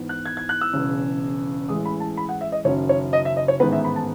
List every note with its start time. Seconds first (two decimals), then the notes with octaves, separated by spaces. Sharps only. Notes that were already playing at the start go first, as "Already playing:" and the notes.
Already playing: G#2 E3 B3
0.09 F#6
0.26 G#6
0.37 G#6
0.49 F#6
0.61 E6
0.73 E1 E2 C#3
1.68 A1 A2 E3 G#3 D#6
1.85 B5
2.00 A5
2.17 B5
2.29 F#5
2.41 E5
2.52 D#5
2.65 F#1 F#2 D#3 F#3 C#4 C#5
2.89 C#5
3.13 D#5
3.25 E5
3.37 D#5
3.48 C#5
3.60 A1 G#2 D#3 G#3 B3 B4
3.73 E5
3.85 B5
3.96 A5